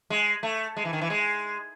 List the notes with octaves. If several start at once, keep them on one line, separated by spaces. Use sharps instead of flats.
G#3
A3
G#3
E3
D#3
E3
G#3